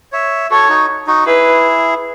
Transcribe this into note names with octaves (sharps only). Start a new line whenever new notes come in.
C#5 E5
F#4 A4 C#5
D#4 F#4
D#4 F#4
E4 G#4 B4